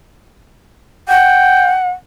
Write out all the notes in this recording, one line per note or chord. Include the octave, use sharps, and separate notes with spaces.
F#5 G5